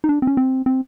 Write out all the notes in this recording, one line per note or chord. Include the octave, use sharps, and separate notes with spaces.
D#4
D4
C4
C#4
C4
C4